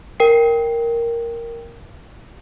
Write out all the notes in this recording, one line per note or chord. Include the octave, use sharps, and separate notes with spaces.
A#4 G5 C7